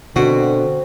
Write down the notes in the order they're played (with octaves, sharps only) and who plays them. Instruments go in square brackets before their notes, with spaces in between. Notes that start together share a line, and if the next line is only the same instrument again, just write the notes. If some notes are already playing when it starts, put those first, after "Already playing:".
[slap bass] B2 [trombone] D3 [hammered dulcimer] C4 [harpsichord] F#4